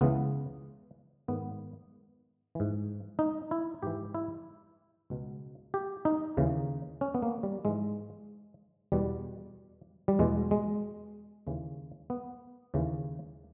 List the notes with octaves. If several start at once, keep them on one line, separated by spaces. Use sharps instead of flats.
C#2 C#3 E3 B3
G#2 D#3 B3
G#2 E3
D#4
E4
G#2 E3 G4
E4
C#2 B2
G4
D#4
D#2 C#3 E3
C#4
B3
A#3
G3
G#2 E3 G#3
E2 B2 G3
G3
E2 B2 G#3
G#3
D#2 C#3 E3
B3
D#2 C#3 E3